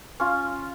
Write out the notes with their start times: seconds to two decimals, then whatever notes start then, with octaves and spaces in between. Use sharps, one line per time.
0.20 C#4 F4